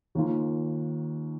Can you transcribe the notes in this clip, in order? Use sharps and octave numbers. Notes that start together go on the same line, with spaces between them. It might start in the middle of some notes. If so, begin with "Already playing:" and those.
D#2 D#3 A#3 F4